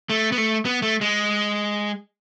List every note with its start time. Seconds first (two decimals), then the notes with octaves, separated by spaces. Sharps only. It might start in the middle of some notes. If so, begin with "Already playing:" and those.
0.10 A3
0.32 B3
0.38 A3
0.65 B3
0.82 A3
1.01 G#3